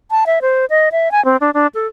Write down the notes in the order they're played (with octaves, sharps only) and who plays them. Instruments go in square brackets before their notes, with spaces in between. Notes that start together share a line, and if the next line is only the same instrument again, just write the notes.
[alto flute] A5
E5
C5
D#5
E5
G#5
C4
D4
D4
A4